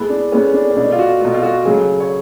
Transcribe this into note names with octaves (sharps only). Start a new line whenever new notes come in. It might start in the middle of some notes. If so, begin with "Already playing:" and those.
Already playing: A2 G#3 B3 A4
D4
A2 G#3 B3 C#4
D4
C#4
B2 A3 D4
F4
F#4
B2 A3 F4
F4
F#4
C#3 F#3 A3 G#4
C#5